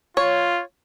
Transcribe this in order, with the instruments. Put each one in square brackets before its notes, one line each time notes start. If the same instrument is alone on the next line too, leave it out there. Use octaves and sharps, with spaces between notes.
[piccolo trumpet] F4 [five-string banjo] C#5